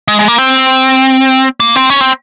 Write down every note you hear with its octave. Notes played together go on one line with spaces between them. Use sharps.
G#3
G#3
A#3
C4
A#3
C4
C#4
C4